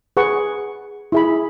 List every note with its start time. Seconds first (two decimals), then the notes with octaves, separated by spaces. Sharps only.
0.17 G#4 B4 F#5 C#6
1.12 E4 G#4 E5 B5